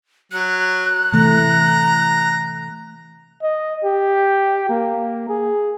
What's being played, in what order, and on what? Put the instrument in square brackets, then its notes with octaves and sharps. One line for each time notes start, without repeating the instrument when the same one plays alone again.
[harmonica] F#3 [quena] F#6
[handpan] C3 E3 A3 [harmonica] A#5
[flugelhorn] D#5
G4
A#3
G#4